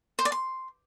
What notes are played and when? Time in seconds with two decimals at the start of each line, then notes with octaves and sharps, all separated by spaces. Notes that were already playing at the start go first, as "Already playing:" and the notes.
0.19 C5
0.25 D5
0.32 C6